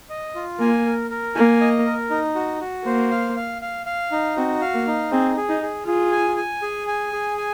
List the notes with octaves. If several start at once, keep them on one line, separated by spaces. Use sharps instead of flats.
D#5
F4
A#3 G#5
A#4
A#4
A#3 G#5
D#5
A#4
D#4
F#4
F#4
A#3 C5
F5
F5
F5
F5
D#4
C4 F#4
F5
A#3
D#4
C4 G#4
G#4
D#4
G#4
F4 G#4
G#5
G#5
G#4
G#5
G#4
G#5